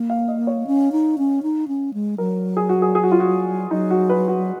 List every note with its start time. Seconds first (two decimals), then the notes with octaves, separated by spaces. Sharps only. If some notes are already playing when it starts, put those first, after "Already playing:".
Already playing: A#3
0.10 F5
0.28 D#5
0.47 C#5
0.67 C#4
0.92 D#4
1.18 C#4
1.43 D#4
1.68 C#4
1.94 G#3
2.18 F#3 A#4
2.57 G#4
2.69 F#4
2.82 G#4
2.95 G#4
3.03 F#4
3.12 F4
3.20 F#4
3.71 F#3 D#4
3.91 F#4
4.10 B4
4.28 F#4